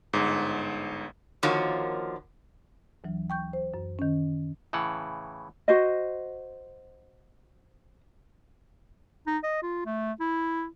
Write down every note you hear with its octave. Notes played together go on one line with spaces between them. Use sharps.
G1 G#2
D3 D#3 F3 A#3 F#4 C#5
D2 E3 F#3
G5 C#6 G6
C5
F#2
D#3 C#4
A2 C#3 E3 F#5
F#4 C5 D#5
D#4
D#5
F4
A3
E4